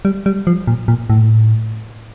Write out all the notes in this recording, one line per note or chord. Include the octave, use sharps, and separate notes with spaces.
G3
G3
F3
A#2
A#2
A2